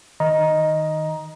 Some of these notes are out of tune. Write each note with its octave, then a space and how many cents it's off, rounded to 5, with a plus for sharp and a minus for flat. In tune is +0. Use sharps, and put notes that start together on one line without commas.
D#3 +5 D#5 +0 A#5 +15